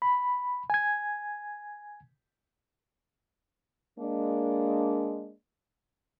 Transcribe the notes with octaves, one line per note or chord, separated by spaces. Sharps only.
B5
G#5 G#6
G#3 A#3 D4